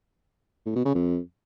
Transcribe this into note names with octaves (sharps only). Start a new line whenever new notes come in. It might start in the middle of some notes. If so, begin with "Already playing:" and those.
A2
B2
C#3
F2